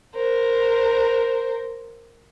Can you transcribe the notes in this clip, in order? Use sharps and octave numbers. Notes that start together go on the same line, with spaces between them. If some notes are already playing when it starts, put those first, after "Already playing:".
A#4 C5